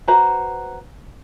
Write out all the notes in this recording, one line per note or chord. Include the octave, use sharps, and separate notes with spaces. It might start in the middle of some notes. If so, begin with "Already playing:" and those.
F#4 B4 C5 A#5